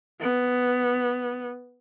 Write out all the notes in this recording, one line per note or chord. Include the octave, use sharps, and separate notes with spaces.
B3